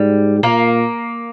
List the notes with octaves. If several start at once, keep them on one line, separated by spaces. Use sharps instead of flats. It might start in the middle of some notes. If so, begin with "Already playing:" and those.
Already playing: G#2 G3
A#2 A#3